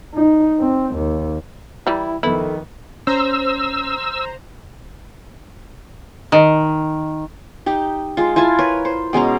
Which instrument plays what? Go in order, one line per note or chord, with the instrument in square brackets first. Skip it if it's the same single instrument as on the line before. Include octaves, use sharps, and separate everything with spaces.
[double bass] D#4
C4
D#2
[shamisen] E3 G3 [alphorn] E4 [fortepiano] A#5
[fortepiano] F2 B3 [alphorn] D#3 [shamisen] E4 [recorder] A4
[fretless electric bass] C#4 [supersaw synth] C5 A#5 [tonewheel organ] E6
[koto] D#3
[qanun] D#4 G4
G#3 F4
E4 F4 G#5 A5
A#4 B4 C#5
C5
B2 G#3 C#4 A#5